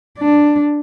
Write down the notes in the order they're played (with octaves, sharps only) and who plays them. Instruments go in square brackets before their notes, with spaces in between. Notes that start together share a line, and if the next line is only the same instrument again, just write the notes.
[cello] D4